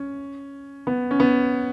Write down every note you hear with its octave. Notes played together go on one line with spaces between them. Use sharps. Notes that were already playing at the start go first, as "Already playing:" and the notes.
Already playing: C#4
B3
C#4
B3